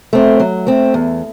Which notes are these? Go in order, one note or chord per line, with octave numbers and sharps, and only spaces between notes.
A3 C4
F#3
A3 C4
E2